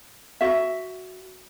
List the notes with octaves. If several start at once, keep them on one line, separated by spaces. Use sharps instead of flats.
F#4 E5